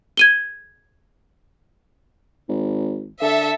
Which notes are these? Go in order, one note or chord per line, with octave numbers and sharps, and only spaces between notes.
G#6 D#7 G7
G#1
D3 A4 E5